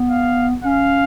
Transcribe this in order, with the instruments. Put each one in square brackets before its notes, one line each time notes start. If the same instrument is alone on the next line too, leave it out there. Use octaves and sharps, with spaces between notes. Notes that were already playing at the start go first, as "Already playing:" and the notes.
Already playing: [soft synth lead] B3
[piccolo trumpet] F5
[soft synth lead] C#4 [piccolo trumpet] F5